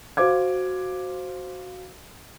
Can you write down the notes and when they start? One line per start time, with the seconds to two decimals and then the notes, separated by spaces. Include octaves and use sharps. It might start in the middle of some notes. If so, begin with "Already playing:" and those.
0.17 F#4 C5 F5 D6 G#6